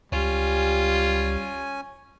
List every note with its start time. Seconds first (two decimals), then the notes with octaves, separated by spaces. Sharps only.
0.12 C#2 G3 C#4 F4 G#5